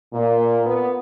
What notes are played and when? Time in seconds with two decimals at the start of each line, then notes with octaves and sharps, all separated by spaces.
0.14 A#2
0.66 B3